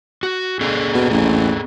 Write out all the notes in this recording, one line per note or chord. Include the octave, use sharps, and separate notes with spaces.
F#4
C4 G#4 A4
B2
A1